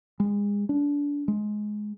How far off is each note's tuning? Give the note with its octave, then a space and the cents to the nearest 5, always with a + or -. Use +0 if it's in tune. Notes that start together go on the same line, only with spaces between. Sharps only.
G#3 -30
D4 -25
G#3 +15